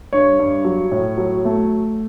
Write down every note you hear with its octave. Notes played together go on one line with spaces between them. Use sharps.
G2 C#5
G2
F#3
A2
F#3
A3